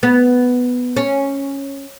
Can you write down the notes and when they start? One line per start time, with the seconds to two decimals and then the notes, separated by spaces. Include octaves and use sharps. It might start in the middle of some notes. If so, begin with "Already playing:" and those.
0.03 B3
0.96 C#4